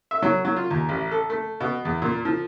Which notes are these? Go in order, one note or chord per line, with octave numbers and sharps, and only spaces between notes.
E5
F#3
F#3
F4
D#2
A1
A4
A3
B2
E2
A#2
F3